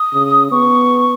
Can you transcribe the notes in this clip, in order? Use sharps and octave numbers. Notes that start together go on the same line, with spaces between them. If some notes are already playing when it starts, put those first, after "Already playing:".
Already playing: D#6
C#3
B3 C#6